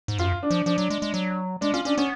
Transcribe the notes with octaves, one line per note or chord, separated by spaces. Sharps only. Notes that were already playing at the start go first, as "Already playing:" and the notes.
G#2
F#2 F4
D4
F3
F3 D4
F#3
G#3
G#3
F#3
G#3 D4
C#4 F4
C#4 D4
B3 C#4